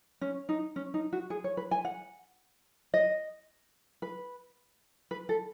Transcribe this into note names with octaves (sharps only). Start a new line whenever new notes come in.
C#4
D#4
C#4
D#4
F#4
G#4
C#5
B4
G#5
F#5
D#5
B4
B4
A4